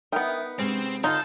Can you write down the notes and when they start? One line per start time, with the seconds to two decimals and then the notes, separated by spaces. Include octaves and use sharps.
0.12 B3 D#4 A#4 E5 G5
0.59 C3 G#3 C4 C#4
1.04 D3 D#4 F4 A4 A#4